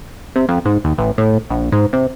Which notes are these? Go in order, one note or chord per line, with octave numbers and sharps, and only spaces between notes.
C3
F2
G#2
D#2
A1
A2
A#1
G#2
C3